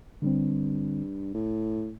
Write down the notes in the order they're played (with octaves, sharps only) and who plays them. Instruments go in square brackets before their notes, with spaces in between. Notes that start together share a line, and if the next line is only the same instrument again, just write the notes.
[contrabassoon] G2 [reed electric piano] D3 G3 C4
[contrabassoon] A2